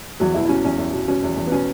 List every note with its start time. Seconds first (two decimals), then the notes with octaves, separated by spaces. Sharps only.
0.20 E2 F#3 F#4
0.34 B2 E3 E4
0.45 E4
0.49 B2 C#4
0.65 E2 C#4
0.78 E2
0.93 B2
1.08 B2 C#4
1.23 E2
1.37 E2
1.47 B3
1.52 B2 C#4